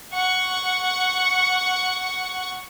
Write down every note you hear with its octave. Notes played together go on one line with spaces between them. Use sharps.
F#5 C#6